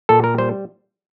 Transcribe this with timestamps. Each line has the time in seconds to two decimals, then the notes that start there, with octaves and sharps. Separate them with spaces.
0.09 A#2 A4
0.24 A#4
0.38 G3 C5